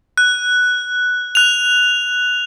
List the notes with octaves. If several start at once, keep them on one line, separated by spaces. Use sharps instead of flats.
F#6
F#6 F7